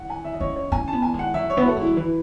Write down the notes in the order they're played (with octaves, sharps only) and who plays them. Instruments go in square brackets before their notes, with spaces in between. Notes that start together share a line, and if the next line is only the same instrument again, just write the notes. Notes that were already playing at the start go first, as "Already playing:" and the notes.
Already playing: [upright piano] F#5
G#5
E5
D#5
[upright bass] C#4 [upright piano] C#5
[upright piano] C#5
[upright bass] C#4 [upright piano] G#5
[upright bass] B3 [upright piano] A5
[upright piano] G#5
[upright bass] G#3
[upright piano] F#5
[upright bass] F#3 [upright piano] E5
[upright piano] C#5
[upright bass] B3
[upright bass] A3 [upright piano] F#4
[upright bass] G#3 [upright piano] E4
[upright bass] F#3
[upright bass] E3 [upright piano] B4